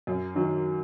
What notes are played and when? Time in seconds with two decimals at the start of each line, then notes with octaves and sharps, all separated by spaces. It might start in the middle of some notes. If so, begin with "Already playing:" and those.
0.07 F#2
0.35 D#3 F#3